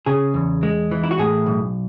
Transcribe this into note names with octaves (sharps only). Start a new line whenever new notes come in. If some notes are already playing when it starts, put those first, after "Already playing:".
C#3 G#4
E2
G#3
E3
E4
F#4
A2 G#4
B1